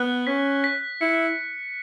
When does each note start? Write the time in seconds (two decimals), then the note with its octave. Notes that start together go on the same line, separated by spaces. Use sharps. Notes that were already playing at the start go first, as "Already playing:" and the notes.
Already playing: B3 F#6
0.27 C#4 B6
0.64 B6
1.01 E4 C#7